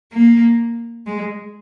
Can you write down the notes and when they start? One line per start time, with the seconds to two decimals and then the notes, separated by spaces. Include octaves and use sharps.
0.12 A#3
1.06 G#3